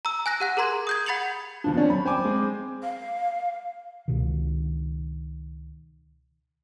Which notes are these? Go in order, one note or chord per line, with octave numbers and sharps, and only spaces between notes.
A#5 E6
G#5 F#6 A#6
G4 F#5 F#6
G#4 A#4 A#5 C6 G#6
D#6 G6 G#6
F#5 B5 A6 C#7 F7 F#7
D#2 B2 F3 D4
C4 C#4 D5
F#3 B5
C5 G5 G#5 D6
G#3 C4
F5
C#2 B2 D#3